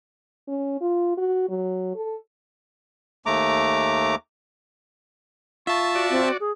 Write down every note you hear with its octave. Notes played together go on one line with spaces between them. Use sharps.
C#4
F4
F#4
F#3
A4
D#2 A3 A#5 D6
F4 E5 A5 C#6
F#4 D5
C4
G#4